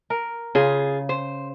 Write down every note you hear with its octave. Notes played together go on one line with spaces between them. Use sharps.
A#4
C#3 F4 G#4
C5